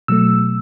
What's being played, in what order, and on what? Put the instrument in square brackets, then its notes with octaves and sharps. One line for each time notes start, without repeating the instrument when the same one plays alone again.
[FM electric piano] B2 F#3 A3 E6